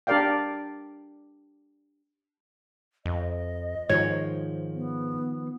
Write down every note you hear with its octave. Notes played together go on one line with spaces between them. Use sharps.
D4 G4 A#4 D5 F5 G5
F2 D#5
G#2 D#3 F3 C#5
B3